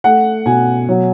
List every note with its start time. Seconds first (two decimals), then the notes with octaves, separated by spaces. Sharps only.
0.04 A3 F#5
0.46 B2 G#5
0.89 F#3